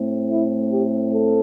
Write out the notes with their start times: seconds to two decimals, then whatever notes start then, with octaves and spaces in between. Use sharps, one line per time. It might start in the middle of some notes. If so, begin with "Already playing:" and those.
Already playing: A2 A3 C4
0.29 E4
0.71 G4
1.11 A4